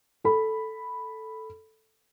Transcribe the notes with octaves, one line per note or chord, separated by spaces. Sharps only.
A4 B5